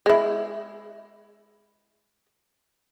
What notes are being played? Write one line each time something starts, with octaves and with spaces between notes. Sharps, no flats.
G#3 E4